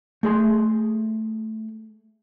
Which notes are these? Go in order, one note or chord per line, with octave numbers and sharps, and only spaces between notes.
A3 G#4 C6